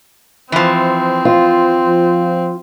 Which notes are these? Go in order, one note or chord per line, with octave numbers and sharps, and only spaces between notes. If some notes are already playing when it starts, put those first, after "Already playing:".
E3 F3 C4
F4
F3